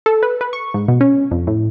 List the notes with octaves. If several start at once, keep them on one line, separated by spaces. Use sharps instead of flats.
A4
B4
B4
C#6
G#2
B2
C#4
F2
A2